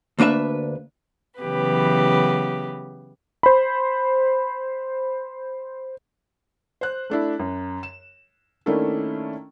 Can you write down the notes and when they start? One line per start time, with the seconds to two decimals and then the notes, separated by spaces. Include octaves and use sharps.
0.19 D2 A#3 D4 B4 E5
1.41 C#3 E3 F#3 B3 G4 B4
3.43 C5 B5
6.81 C5 F#6
7.10 A3 D4 E4
7.39 F#2
7.83 E7
8.66 D#3 A3 A#3 C#4 D4 E4